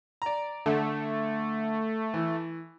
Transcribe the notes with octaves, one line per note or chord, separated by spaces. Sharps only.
D5 A#5
D3 A3
E3